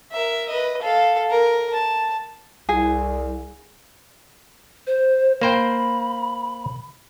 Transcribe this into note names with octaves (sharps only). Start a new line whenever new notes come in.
A#4 E5
B4 D#5
A4 F5
A#4
A5
C2 G#4
C5
A#3 C5 G5 B5